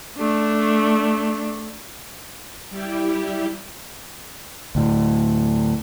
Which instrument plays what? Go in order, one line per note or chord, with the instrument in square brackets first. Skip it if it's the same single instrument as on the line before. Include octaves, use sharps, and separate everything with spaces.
[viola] A3 D4
[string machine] G3 E4 G4
[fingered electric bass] D2 A2